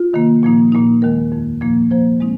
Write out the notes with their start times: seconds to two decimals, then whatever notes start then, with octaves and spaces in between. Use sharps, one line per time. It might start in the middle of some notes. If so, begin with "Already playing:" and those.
Already playing: F4
0.13 C3 D#3 A#3
0.43 A#2 F3 A#3 D#4
0.72 A#2 A#3 D#4
1.02 D#2 D#3 G#3 A#4
1.32 F2 D#3 A#3
1.61 A#2 F3 A#3 D#4
1.91 C3 F3 A#3 C5
2.20 G#3 C4 D#4